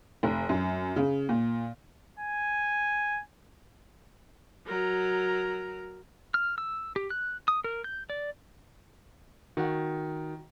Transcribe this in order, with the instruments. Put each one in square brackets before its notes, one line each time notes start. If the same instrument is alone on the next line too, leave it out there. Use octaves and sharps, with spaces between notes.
[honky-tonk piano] F1
F#2
C#3
A#2
[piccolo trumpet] G#5
[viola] F#3 A#4
[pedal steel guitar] F6
E6
G4
F#6
D#6
A#4
G6
D5
[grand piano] D#3 [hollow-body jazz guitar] F#4 F#5